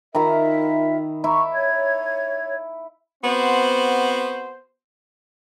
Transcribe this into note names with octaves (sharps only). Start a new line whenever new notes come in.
D#3 E4 F4 A#4 E5 A#5
E4 A#5 C#6
C#5 G#6
B3 C4 F#4 C5